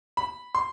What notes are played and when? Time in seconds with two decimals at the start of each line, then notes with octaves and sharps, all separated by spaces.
0.17 B5
0.55 C6